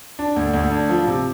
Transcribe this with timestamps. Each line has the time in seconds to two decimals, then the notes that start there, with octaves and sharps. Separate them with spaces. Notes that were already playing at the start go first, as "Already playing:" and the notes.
0.19 D4
0.36 D2
0.54 D2
0.71 D4
0.89 F3
1.07 C3